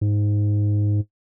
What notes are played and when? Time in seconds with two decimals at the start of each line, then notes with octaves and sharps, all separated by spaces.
0.01 G#2